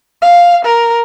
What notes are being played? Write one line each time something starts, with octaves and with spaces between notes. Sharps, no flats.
F5
A#4